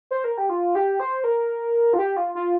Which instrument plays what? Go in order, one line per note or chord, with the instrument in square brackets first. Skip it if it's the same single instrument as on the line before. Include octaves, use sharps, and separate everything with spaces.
[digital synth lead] C5
A#4
G4
F4
G4
C5
A#4
F4
G4
F4
F4